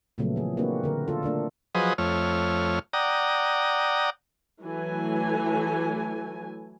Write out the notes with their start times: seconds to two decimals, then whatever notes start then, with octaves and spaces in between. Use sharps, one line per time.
0.18 A#2 C#3 F3 F#3 A3 B3
0.36 E3 G#4
0.57 A#3 C4 D4 F#4 B4
0.84 D3 A#4
1.08 F4 A4
1.23 A3 A#3 D4
1.75 F3 F#3 G#4 B4 C5 D#5
1.98 F2 A3 C#5 F6
2.93 D5 F#5 G5 A#5 D#6
4.63 E3 F#3 A3 A4 G#5